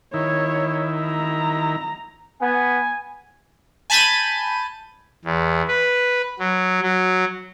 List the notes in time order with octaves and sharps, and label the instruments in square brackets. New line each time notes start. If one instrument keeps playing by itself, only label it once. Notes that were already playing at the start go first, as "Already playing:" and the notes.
[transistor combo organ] D#3 E4 [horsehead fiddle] C#5
[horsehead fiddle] A#5
[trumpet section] B3 [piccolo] G#5
[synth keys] G#5 A5 B5 G6 A6 D#7
[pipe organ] E2
B4
F#3
F#3